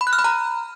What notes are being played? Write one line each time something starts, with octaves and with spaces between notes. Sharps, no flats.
B5
F#6
F6
B5
A#5